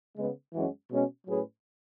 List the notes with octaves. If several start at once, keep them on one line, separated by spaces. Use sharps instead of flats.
C#3 G#3 B3
F#2 E3 G#3 C#4 F#4
B2 G#3 C#4
A2 F#3 C#4 G#4 B4